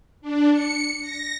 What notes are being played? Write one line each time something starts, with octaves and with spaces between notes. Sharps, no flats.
D4
C#7
A#6